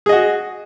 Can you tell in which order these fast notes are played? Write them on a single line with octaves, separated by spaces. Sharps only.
G#4 D#5 F#4